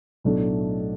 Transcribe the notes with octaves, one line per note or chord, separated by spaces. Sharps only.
B1 A2 F#3 A3 D4